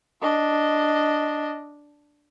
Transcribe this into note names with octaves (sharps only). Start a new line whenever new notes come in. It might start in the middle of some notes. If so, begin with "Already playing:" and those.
D4 D#5